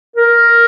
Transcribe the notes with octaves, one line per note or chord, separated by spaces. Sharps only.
A#4